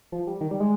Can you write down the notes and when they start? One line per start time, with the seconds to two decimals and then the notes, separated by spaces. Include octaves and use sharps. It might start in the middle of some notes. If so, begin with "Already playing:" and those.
0.12 F3
0.27 G3
0.41 D#3
0.51 G3
0.60 G#3